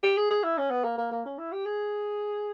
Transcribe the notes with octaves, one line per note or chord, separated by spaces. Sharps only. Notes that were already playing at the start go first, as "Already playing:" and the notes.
G4
G#4
G#4
E4
C#4
B3
A#3
A#3
A#3
C#4
E4
G4
G#4